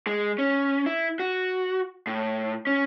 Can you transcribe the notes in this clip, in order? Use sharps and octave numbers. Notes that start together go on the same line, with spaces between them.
G#3
C#4
E4
F#4
A2
C#4